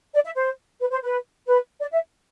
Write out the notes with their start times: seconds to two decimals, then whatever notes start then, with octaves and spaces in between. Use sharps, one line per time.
0.14 D5
0.25 E5
0.35 C5
0.80 B4
0.91 C5
1.03 B4
1.47 B4
1.80 D5
1.92 E5